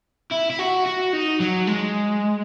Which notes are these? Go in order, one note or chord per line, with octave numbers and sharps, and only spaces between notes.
E4
E4
F#4
F#4
D#4
F#3
G#3